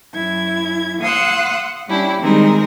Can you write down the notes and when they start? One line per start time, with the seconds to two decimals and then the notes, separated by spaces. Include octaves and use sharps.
0.14 F#2 E4 G#6
1.01 F5 F#5 C6 D#6 E6 F#6
1.87 G3 C#4 D4 E4 G4
2.20 D#3 G3 G#3 C4 D#4 A#4